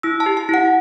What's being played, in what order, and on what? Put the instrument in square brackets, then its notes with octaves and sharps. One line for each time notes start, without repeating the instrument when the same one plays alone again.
[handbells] E4 E6
A5
G4
A5
E4 F#5